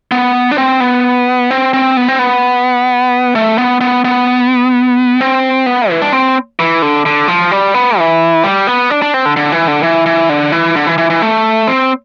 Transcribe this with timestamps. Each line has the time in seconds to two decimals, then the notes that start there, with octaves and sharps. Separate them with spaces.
0.12 B3
0.51 D4
0.58 C4
0.80 B3
1.51 C4
1.73 C4
1.97 B3
2.08 C4
2.19 B3
3.35 A3
3.58 B3
3.81 B3
4.05 B3
5.21 C4
5.66 B3
5.90 E3
6.02 D4
6.12 C4
6.59 E3
6.82 D3
7.05 D3
7.28 F3
7.51 G3
7.74 B3
7.98 E3
8.44 G3
8.67 B3
8.90 D4
9.02 D4
9.14 C4
9.25 D3
9.37 D3
9.52 E3
9.67 D3
9.83 E3
10.06 E3
10.29 D3
10.52 E3
10.76 D3
10.87 E3
10.98 E3
11.10 E3
11.22 A3
11.67 C4